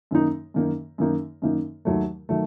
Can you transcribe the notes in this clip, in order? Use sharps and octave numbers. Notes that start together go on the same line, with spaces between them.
F#2 D#3 A#3 D#4
F#2 D#3 A#3 D#4
F#2 D#3 A#3 D#4
F#2 D#3 A#3 D#4
D#2 D#3 F#3 A3
D#3 F#3 A3